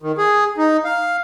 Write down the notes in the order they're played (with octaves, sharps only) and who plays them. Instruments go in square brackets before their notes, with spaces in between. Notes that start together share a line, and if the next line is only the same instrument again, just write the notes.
[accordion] D#3
G#4
D#4
F5